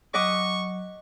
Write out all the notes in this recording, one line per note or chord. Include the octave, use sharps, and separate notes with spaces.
F#3 D#5 F#5 C#6 D6